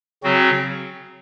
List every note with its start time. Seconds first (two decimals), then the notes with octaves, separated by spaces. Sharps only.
0.23 C#3 F#3 C4 F#4